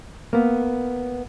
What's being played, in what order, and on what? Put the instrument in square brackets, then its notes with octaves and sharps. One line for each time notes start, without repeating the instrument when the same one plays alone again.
[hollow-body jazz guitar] A#3 B3